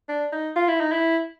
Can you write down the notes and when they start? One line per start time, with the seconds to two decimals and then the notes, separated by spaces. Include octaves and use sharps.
0.09 D4
0.32 D#4
0.56 F4
0.68 E4
0.80 D#4
0.92 E4